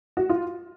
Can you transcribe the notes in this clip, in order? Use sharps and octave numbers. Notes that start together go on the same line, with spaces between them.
F#4
F4